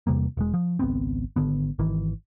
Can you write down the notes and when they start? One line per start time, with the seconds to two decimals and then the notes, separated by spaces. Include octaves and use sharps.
0.07 E2 C3 G3 A#3
0.37 E1 G#3
0.54 F3
0.79 G#1 C#2 B3 C4
1.36 G#1 D#2 D3 B3
1.79 G#1 D#3 E3